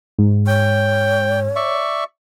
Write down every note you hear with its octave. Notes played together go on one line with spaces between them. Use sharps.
G#2
C#5 G5
D5 E5 C#6